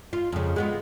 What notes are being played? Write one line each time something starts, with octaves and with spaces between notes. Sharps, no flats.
F4
F2 C#3
G#3 B3 F4